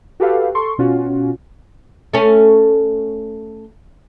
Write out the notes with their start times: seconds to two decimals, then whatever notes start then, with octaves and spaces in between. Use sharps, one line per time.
0.20 F#4 G4 A4 B4 F5
0.55 A4 C6 C#6
0.78 B2 C#4 F4 F#4
2.13 A3 C#4